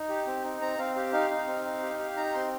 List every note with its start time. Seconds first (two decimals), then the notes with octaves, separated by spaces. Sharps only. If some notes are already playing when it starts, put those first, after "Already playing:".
Already playing: D#4
0.09 G4
0.27 C4
0.44 D#4
0.61 C4 A#5
0.78 C4 F5
0.95 G4 F5
1.13 D#4 F5
1.31 D#4
1.47 C4
1.65 D#4
1.83 G4
1.99 G4
2.17 D#4 A#5
2.34 C4 C6